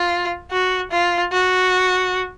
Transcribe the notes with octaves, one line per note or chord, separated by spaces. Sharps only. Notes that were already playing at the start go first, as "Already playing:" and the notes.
Already playing: F4
F#4
F4
F#4